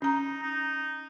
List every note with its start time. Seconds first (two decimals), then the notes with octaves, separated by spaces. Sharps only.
0.02 C#4 D#4 A#5
0.43 D#4